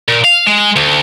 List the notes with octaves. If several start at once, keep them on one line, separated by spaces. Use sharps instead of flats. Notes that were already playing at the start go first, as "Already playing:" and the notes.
A#2
F5
G#3
D2